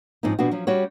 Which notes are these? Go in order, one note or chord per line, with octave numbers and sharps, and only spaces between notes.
G#2 F3 C4 C#4 D#4
B2 F3 B3 C4 D4 F#4
F3 F#3 C#4
G3 C#4 F#4 C#5